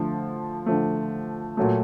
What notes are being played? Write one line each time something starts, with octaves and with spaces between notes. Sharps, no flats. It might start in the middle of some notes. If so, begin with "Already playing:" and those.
Already playing: D3 F3 A3
D3 F3 A3
A#2 F#3 A3